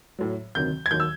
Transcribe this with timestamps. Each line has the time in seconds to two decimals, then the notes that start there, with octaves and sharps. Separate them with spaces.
0.19 A2 F#3
0.55 D2 C3 D#3 F#3 G6
0.86 G#6
0.91 D#2 D#3 F#3 G6
1.00 E6